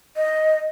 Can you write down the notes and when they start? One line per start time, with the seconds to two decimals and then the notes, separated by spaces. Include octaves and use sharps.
0.16 D#5